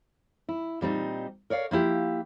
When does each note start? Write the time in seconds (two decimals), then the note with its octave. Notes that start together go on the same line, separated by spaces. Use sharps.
0.49 E4
0.81 A#2 G3 C4 D#4
1.50 A#4 C#5 D5 F5
1.71 F3 A#3 E4 G4